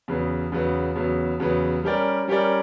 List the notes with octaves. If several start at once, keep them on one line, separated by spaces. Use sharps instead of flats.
E2 C#3 F#3 B3
E2 C#3 F#3 B3
E2 C#3 F#3 B3
E2 C#3 F#3 B3
G3 C#4 G4 A#4 D5
G3 C#4 G4 A#4 D5